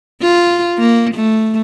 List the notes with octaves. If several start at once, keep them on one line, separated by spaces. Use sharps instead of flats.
F4
A#3
A3